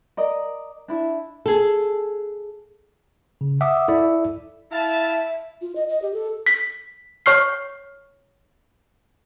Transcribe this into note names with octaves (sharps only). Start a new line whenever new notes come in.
A#4 D5 D#5
D4 E4 E5
G#4 A4
C#3
E5 F#5 D6 D#6
E4 A4 D5 E5
E4 E5 F5 A5
F4
D#5
D#5
G4
A4
B6
C#5 C#6 F6 C7